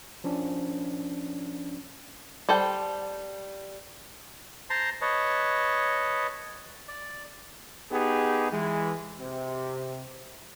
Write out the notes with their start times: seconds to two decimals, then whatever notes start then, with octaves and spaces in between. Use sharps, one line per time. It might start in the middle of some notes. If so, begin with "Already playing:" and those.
0.24 F3 C#4 D4
2.49 G3 A4 C5 G5
4.70 C5 A5 A#5 C6
5.01 B4 C#5 D#5 A5
6.88 D5
7.91 B3 D#4 G4 G#4
8.51 E3 G#3
9.19 C3